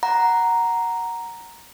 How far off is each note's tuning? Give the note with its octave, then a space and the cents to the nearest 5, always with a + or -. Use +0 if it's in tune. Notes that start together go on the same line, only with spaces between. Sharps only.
F#5 +0 A#5 +0